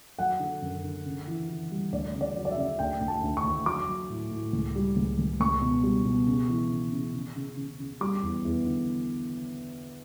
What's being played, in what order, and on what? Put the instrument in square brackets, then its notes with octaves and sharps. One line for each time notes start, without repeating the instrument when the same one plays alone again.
[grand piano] F#3 F#5
D3
F#2
D3
C#3
E3
E3
G3
D2 D5
C#3
D5
F#3
D5
E5
C#3
D2 G5
D2
A5
D2
C#6
D2
F#3 D6
F#3
A2
A2
C#2
G3
C#2
C#2
C#2 C#6
B2
G3
B2
C#3
E3
C#3
C#3
C#3
C#3
C#3
C#3
G3 D6
E2
E2
D3